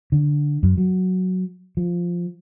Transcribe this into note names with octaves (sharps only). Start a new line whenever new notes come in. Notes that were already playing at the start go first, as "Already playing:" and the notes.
D3
F#2
F#3
F3